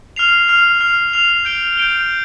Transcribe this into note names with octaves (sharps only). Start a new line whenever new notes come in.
F6 C7 F7
F6 C7 F7
F6 C7 F7
F6 C7 F7
G6 D7 G7
G6 D7 G7